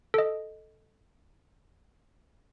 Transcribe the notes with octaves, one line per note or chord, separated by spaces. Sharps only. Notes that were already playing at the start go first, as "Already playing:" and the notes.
A4 D#5